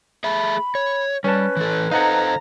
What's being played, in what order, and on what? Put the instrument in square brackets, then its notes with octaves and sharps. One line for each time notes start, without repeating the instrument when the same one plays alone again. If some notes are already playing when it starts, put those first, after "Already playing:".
[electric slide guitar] A3 G#4 E5 [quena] B5
[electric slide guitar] C#5
[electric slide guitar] G3 [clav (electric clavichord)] C#4 A5 [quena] B4
[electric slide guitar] E3 A4
[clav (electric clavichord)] D#4 F#5 [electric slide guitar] A4 C5 F5 [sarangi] A#5